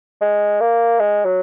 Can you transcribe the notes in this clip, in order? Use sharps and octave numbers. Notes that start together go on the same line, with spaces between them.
G#3
A#3
G#3
F#3